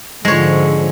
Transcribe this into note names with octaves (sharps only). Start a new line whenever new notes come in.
G#2 D3 F3 G#3 C#5